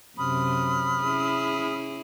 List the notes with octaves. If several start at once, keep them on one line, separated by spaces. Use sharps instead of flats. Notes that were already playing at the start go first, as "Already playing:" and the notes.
F#2 C3 B5 D#6 F6
C#4 E4 G#4